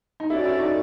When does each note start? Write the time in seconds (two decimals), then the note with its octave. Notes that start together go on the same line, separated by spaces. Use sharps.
0.20 D#4
0.30 C#4 E4 F#4 A4 D5
0.45 E4
0.60 D#4